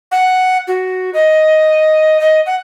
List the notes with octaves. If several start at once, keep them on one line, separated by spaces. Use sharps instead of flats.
F#5
F#4
D#5
D#5
F#5